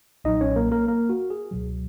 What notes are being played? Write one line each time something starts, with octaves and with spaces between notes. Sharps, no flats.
B1 A#2 F#3 D#4 D#5
C#4 C#5
A#3 A#4
A#3 A#4
A#3 A#4
F#4
G#4
C#2 B2 F#3